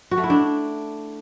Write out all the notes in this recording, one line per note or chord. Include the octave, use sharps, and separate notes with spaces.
F#4
A3
E4
D4